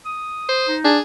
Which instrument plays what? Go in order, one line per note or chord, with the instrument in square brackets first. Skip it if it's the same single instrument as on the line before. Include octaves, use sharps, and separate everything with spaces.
[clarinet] D#6
[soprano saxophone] C5
[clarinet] D#4
[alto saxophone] D4 [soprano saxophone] G#4